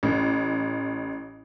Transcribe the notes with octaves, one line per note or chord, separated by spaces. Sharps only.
A1